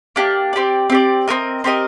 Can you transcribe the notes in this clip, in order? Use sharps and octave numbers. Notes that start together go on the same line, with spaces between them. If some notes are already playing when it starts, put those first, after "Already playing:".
A#3 D4 G4
C4 G4 D5
C4 G4 D5
C4 G4 A#4 D#5
C4 G4 A#4 D#5